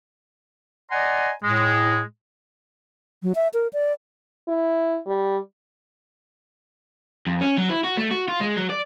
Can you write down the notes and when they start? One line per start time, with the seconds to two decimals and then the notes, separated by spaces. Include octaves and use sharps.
0.91 D5 D#5 F#5 G#5 A#5 C6
1.44 A2 G#3
3.23 F#3
3.35 E5
3.54 A#4
3.73 D5
4.48 E4
5.06 G3
7.27 F2
7.41 C#4
7.58 F#3
7.69 E4
7.84 F#4
7.97 A3
8.11 F#4
8.28 F4
8.41 G#3
8.57 F#3
8.70 D5